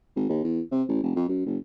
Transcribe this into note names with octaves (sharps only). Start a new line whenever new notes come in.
G#1
D#2
E2
C3
A1
F1
F2
F#2
F#1